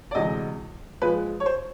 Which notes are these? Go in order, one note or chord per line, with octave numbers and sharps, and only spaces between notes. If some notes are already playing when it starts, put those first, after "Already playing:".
D5
D2 C3 E3 G#3 D#5
A#2 F3 G#3 B4
C#5
C5